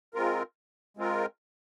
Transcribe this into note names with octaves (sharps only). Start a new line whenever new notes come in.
G#3 C4 F4 A#4
G#3 C4 F4 A#4